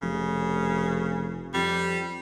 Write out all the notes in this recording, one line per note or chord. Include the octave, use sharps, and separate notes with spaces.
F1 C#3
F2 G3